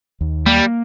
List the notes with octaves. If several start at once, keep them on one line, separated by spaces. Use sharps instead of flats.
D#2
G3 A#3